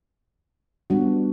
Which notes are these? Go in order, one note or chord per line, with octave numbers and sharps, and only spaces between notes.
G3 B3 D4 F#4